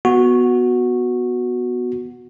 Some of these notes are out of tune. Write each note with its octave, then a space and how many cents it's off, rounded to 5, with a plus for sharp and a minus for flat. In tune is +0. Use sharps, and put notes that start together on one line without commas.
B3 +0 F#4 -10